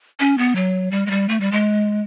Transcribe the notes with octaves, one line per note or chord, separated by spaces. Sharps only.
C#4
B3
F#3
G3
G#3
G3
A3
G3
G#3